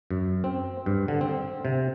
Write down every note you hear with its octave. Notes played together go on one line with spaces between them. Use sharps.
F#2
C4
G2
D3
C4
C3